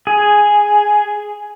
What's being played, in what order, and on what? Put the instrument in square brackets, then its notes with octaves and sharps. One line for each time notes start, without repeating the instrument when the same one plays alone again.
[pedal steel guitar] G#4